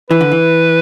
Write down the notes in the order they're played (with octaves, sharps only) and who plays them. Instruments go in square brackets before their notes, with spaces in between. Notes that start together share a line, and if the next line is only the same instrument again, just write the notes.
[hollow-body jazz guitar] E3 [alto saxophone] B4
[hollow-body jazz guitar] D3
E3